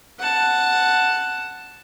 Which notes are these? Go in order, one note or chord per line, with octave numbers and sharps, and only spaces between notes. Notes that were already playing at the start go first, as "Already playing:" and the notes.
F#5 A5